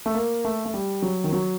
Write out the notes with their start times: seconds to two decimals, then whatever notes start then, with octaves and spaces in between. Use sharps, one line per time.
0.06 A3
0.14 A#3
0.45 A3
0.65 A3
0.74 G3
1.02 F#3
1.24 D#3
1.32 F#3